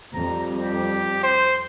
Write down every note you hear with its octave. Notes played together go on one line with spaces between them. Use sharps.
F2 G3 A#5
G4
C5